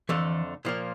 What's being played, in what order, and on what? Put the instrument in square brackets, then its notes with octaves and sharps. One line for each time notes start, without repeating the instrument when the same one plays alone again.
[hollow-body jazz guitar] F2 D3 A3 [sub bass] E3
[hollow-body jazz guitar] A#2 F3 A#3